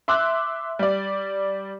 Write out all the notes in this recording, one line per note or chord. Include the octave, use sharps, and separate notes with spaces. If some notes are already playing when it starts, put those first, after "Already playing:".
E5 C6 D6 E6 F#6
G3 D5